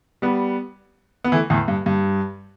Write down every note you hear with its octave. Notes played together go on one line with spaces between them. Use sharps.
G3 B3
B3
E3 A3
E2 A2
G2
G2